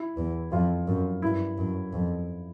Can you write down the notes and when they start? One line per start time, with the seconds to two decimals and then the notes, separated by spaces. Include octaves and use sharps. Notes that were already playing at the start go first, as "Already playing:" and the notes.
Already playing: E4
0.17 E2
0.52 F2 F4
0.87 F#2
1.22 G2 E4
1.57 F#2
1.93 F2